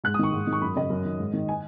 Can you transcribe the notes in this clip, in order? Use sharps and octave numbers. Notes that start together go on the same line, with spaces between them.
G#2 F#6
D#6
D#3 C#6
G#2
D#3
C#6
F#2 B5
C#3 D#5
F#2
D#3
G#2
D#3
G#5